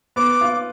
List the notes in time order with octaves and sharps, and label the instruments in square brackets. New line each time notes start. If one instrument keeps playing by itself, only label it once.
[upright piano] B3 [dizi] D6
[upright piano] F4
[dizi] D6